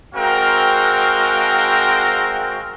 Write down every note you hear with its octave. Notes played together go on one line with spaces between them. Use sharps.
G#3 C4 F#4 A#4 F5 G5